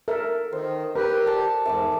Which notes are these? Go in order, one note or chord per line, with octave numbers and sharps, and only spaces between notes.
A4 A#4 E5
D#3 C5
G4 A#4 B4
A4 D5 A5
E2 G#2 E5 A5 D6